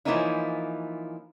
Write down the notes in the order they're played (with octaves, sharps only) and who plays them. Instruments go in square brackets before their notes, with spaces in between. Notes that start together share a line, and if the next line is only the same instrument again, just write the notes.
[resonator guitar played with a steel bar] E3 F3 A#3 C#4 D#4 E4